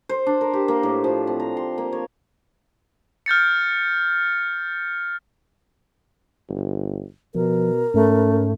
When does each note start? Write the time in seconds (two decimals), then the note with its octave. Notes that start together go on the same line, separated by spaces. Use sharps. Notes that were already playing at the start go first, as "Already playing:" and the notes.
0.09 C5
0.27 D4
0.41 A#4
0.53 G4
0.68 A#3
0.83 A2
1.04 F3
1.27 C4
1.40 A#5
1.57 C6
1.78 A#3
1.93 C#5
3.26 F6 G6 A6 C#7
6.49 G1
7.35 B2 F3 A#4
7.94 G#2 A3 C#4